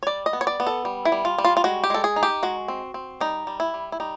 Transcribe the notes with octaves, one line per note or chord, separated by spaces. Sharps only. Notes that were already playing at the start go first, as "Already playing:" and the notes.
C#5
G3 D5
D#5
B3
C#5
D5
B3
A4
G3
E4
G3
F4
G3
F4
F4
G#3 F#4
G4
G#3 A4
G#4
D#4
G4
G#3 F#4
C4
C4
G3 D#4
G3
E4
G3
E4
G3 D#4